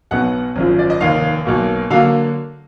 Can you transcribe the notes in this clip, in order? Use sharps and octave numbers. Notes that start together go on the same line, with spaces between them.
B1 B2 F#3 B3 F#5
G#1 F#2 F3
D5
D#5
F1 D#2 D#3 F5
B1 B2 A#3
D3 F#3 A#3 F5